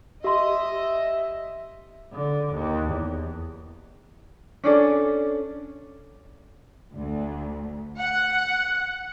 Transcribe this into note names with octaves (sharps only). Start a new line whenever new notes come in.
G4 D#5 E5 C6
D3
D#2
E2
C#4 D4 A4
D2
F#5